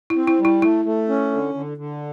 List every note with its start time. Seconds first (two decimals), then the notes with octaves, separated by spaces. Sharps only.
0.10 E4
0.16 C4
0.27 E4
0.39 G3
0.45 E4
0.62 A3 E4
0.85 A3
1.09 C#4
1.32 D3
1.54 D3
1.77 D3